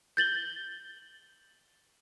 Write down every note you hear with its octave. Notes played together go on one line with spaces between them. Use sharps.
G6 A6 F#7 G7